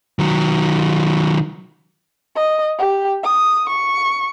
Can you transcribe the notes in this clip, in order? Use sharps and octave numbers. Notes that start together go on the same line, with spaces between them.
D#3 F#3
D#5
G4
D#6
C#6